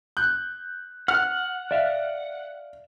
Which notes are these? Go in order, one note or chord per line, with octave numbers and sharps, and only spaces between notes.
F#6 G6
F#5 F6
D5 E5 F5